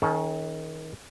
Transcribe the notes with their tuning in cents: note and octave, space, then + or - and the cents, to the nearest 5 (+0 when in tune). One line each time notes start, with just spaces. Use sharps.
D#3 +30 C#4 +0 A4 -35